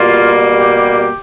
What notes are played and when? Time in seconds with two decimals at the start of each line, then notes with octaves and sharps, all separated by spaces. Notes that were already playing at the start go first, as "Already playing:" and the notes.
Already playing: B2 G3 A#3 F4
0.57 G4